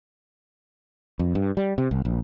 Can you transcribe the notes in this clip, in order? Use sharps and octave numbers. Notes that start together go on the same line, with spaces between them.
F2
G2
G3
C3
C2
A#1